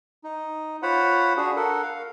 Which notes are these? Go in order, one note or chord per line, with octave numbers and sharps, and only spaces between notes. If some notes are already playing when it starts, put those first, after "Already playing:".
D#4
F4 C5 C#5 F#5 B5
D4 F#4 G#4
A4 A#4 F#5
F5